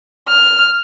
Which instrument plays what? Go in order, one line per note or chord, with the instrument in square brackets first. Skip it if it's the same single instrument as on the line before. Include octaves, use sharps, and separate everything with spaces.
[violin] F6